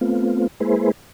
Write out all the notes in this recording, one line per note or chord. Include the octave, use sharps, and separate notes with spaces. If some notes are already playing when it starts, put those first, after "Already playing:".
A3 B3 C4 F4
G#3 A#3 E4 G#4 B4 C5